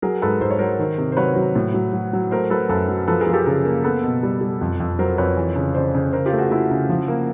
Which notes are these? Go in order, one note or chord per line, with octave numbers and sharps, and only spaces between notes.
F#3 G#4 A#4
G#2 A4 B4
G#2 C5
C#5
F#3 A#4 C5
D#3
C3
C5
F#3 B4 C#5
F#3
A2
F#3
F#3
F#3
A3 A#4 C5
F#3 A4 B4
F#2 A4 B4
F#3
F3 A4 B4
G#4 A#4
F3
G4 A4
C#3 G#4 A#4
A#3
B3 A4 B4
B2
G3
G3
F2
F2
F#3 A#4 C5
F2 B4 C#5
E3
C#3
C#3 C5 D5
C#3
C#3 A#4 C5
F4 G4
A3
F#4 G#4
A3 E4 F#4
C#3
F3
A#3